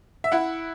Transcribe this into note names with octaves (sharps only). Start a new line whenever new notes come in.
E5
E4 F#5